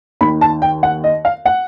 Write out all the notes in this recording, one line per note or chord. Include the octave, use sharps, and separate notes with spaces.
D#2 D#3 B5
A5
G5
F#5
D#5
F5
F#5